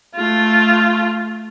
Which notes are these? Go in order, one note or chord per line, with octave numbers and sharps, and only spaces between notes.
A3 F4